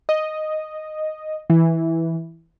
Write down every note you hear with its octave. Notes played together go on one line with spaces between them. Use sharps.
D#5
E3